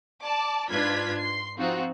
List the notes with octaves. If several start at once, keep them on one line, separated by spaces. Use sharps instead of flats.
D5 A5 D6
G#2 D4 F4 B4 G#6 B6
C6 C7
F3 C4 D#4 F4 F#4